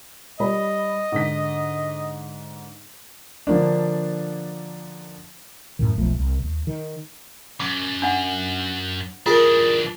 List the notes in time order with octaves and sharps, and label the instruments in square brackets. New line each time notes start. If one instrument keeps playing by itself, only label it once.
[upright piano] G3 C#5 B5 [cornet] D#5
[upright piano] G#2 D3 B6
[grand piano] D3 F3 A#3 D4
[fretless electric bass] F#2 A2 D#3
E1 B1 F3 A3
C2
D#2
D#3
[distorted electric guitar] F#2 [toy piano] D6
[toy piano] D4 F#5
[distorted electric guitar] E3 D4 [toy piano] F4 [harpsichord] G#4 A#4